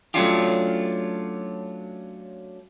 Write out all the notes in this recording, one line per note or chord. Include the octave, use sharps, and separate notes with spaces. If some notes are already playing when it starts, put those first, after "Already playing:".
F#3 A3 C#4 D4 F4 G4